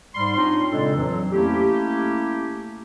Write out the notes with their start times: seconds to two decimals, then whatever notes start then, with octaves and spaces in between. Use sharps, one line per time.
0.15 G#2 G3 C6
0.36 C4 D4 D#4 F4 C#5 C6
0.72 A#2 C#3 G#3 D4 A4
0.95 F2 E3 F#3
1.32 A3 A#3 C#4 E4 G4